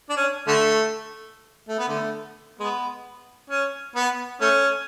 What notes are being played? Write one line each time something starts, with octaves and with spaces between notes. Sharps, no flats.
D4
C#4
D3 A3
A3
B3
D3 A3
G#3 B3
C#4
B3
A3 C#4